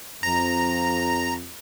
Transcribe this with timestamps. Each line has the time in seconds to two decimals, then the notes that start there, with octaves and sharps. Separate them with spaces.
0.23 F2 A#5